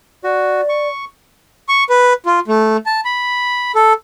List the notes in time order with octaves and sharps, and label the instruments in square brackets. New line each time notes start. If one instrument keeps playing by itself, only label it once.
[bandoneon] F#4 [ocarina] D5
[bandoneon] C#6
[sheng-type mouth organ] C#6
B4
F4
A3
A5
B5
A4